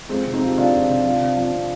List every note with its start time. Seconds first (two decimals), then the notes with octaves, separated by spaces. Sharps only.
0.09 F3 G#3 C4
0.26 C3
0.33 C4 D#4
0.41 F3
0.47 G4
0.57 C3 D4 F4
0.73 F3
0.89 C3
1.05 F3
1.20 C3
1.37 F3
1.52 C3